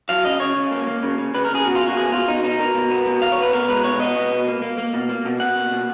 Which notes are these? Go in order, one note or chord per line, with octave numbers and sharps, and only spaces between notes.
F#3 F5
C#3 D#5
C#3 C#5
C#3
A#3
A#3
C#3
C#3
C#3 B4
A#4
C#3 G#4
B2 F#4
F4
A#3
F#4
B2 G#4
B2 F4
B2 D#4
B2 D#4
B2 A#4
B2
B3
B2
B2 F5
C#5
B3 B4
B2 A#4
G#3 B4
B2 C#5
B3 D#5
B2
B2
A#3
A#3
A#3
B2
A#3
B2
B2 F#5
A#3
B2